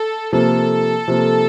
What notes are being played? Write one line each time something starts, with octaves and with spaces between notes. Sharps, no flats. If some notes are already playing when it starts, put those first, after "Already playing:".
Already playing: A4
C3 F3 A#3 A4
C3 F3 A#3